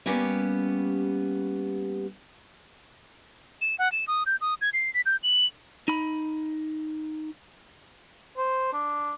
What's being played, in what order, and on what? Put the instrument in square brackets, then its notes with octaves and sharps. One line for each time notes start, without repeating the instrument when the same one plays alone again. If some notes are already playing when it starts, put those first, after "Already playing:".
[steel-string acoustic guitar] G3 A#3 B3 C#4 G4
[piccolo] E7
F#5
E7
D#6
G6
D#6
G#6
C7
B6
G6
F#7
[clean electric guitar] D#4 B5
[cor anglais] C5
D4